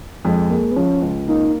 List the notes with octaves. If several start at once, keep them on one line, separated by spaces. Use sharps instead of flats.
F2 G#3
G#3 A#3
B3
F3 C#4
C#2
A#3 D#4